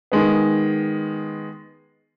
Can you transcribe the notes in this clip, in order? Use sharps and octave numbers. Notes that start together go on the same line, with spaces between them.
D#3 G#3 B3